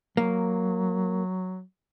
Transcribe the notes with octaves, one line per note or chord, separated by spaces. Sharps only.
F#3 A#3